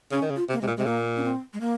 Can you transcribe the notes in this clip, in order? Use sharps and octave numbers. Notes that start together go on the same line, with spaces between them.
C#3 C#4
D#3
C#3
F4
C3
A#3
C3 G#3
A#2
C3 G#3
A#2 A#3
C#4
C4
G#3
A#3